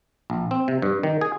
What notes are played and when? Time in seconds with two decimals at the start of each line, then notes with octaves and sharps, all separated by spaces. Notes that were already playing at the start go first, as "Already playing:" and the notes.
0.30 A#1
0.51 C4
0.68 C3
0.82 G2
1.03 D#3
1.21 G#4